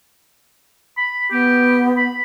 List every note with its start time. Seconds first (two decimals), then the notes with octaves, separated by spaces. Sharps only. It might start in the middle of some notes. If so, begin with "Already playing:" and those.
0.97 B5
1.32 B3 G4
1.97 B5